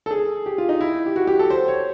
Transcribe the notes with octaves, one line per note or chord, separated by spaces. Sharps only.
A4
G#4
G4
F4
D#4
E4
G4
F#4
G4
A4
C5
C#5